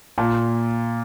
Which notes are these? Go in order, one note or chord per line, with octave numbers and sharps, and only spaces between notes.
A#2